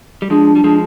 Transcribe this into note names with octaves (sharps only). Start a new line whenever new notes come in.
G3
F3 G#3 D4
G3
F3 G#3